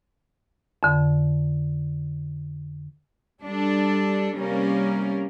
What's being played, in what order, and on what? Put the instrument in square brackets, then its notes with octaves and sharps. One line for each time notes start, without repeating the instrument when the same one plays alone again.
[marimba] F2 D3
[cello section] G3 D4 A4
C3 G3 A#3 C#4 A#4